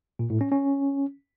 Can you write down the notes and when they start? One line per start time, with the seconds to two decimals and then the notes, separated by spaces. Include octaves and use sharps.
0.19 A#2
0.30 A2
0.41 C#4
0.52 C#4